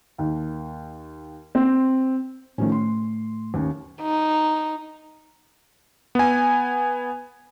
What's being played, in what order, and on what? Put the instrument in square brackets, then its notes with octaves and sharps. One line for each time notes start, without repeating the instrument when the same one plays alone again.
[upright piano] D#2
C4
[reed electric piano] A2 A3 [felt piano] D#3 F3 C#4
[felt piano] C6
D#2 C#4
[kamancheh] D#4
[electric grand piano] B3 G#5